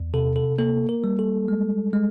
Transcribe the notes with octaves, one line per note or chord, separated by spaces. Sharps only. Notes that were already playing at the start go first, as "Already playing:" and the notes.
Already playing: E2
C3 A4
A4
A#3 A4
A#4
G3
A4
G#3
G#3